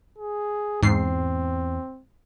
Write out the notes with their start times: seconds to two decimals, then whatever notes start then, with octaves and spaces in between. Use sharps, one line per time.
0.18 G#4
0.83 E2 G#2 C4 C7